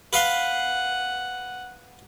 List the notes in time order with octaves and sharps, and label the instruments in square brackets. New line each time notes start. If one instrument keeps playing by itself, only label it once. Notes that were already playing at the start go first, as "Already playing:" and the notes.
[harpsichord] B4 F5 C6 [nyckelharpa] F#5